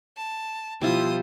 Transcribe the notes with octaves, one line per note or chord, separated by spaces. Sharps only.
A5
B2 F3 G3 E4 F4 C5 D#6